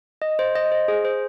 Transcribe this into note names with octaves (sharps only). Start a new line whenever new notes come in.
D#5
C5
D#5
C5
G#4
C5